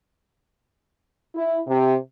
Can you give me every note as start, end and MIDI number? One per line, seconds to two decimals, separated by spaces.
1.35 1.59 64
1.67 1.96 48